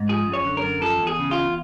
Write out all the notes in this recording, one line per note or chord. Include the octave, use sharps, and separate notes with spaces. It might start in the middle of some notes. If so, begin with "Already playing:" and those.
Already playing: G#2
F3 G#4
F#2
C#5
D3
A#4
F#2
F3 A4
E2
G#4
C#3
E2 F4